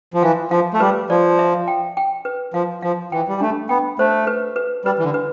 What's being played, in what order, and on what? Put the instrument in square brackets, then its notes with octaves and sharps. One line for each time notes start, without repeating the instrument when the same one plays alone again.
[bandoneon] F3
[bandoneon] E3 [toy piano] F5
[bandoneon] F3 [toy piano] F5
[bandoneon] A3
[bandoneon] G3 [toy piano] B4
[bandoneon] F3 [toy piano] D5
[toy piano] E5
G5
G5
B4
[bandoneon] F3 [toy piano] F5
[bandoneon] F3 [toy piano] F5
[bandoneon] E3 [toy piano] G5
[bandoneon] G3
[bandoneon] A3 [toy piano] D4
[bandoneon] B3 [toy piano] G5
[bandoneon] A3 [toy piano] C5
[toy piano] B4
B4
[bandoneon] G3 [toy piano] B4
[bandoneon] E3
D3
[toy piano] B4